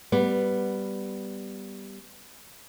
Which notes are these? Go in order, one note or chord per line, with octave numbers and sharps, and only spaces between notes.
G3 B3